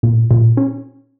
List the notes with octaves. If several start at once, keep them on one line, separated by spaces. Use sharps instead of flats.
A#2
A#2
C#4